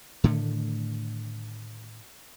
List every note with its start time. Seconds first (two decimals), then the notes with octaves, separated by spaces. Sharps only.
0.24 A2 D3 D#3 A3